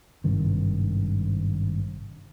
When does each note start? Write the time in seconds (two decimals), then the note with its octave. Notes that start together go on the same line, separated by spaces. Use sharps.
0.24 G#1 G2 C3 D#3